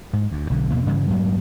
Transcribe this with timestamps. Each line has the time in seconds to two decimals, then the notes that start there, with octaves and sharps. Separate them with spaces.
0.13 G#2
0.32 D2
0.50 B1 D3
0.71 E2 B2 A#3
0.86 G2 C#3 E3 G3
1.10 D2 G2 F#3 A#3